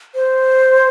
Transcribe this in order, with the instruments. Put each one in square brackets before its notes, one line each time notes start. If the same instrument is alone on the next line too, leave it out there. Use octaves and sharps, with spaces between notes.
[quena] C5